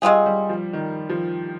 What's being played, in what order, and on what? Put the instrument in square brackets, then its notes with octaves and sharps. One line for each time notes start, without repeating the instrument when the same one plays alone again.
[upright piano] G3 [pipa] G#3 C4 F4 G#4
[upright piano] G3
F3
D#3
F3